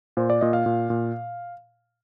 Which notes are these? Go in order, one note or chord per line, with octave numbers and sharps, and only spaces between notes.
A#2 C5
D5
A#2 D#5
F5
A#2
A#2